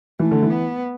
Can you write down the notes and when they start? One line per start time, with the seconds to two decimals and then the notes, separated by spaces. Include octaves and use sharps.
0.19 E3 A3
0.31 D3
0.42 E3
0.50 B3